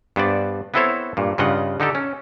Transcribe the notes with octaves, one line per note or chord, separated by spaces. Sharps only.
G2 B3 C5 D5
B3 C4 E4 A4 C5 C#5
G2 A#2
G2 C#3 F4 D#5 F#5
D3 D#4 G4 A4
C#4